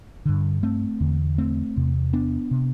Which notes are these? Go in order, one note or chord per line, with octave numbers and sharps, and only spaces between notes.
G2 D3
A3 C4
E2 D3
A3 C4
E2 C3
B3 D4
C3